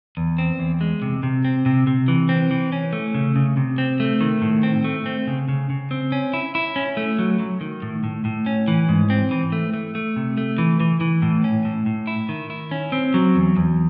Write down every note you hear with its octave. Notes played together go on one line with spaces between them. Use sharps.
E2
C4
E2
G#3
C3
C3
C4
C3
C3
E3
C4
E3
C#4
A3
C#3
C#3
C3
C4
A3
D#3
A2
C4
A3
C4
C#3
C#3
C#3
C4
C#4
E4
E4
C#4
A3
F#3
F#3
D#3
A2
A2
A2
C#4
E3
G#2
C4
E3
A3
A3
A3
C3
A3
E3
E3
E3
A2
C#4
A2
A2
E4
D#3
E4
C#4
C4
F#3
E2
E2